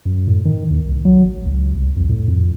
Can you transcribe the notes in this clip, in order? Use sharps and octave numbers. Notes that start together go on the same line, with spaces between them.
F#2
A2
D#3
D#2
C2
F#3
A1
C#2
C2
F2
A2
F2